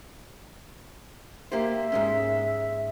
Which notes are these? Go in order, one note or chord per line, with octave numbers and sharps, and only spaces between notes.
A#3 G4 C5 E5
G#2 G#3 C#4